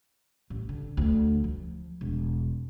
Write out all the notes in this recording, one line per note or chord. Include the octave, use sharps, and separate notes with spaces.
A1
D3
D2
F3
E1